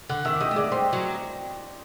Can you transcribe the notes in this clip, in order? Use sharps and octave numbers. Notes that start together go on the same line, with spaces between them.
D3 F#5 F#6
D#3 E5 E6
D6
G3 D#5 D#6
A3
G#3 D5 D6
G3 C5 C6
F#3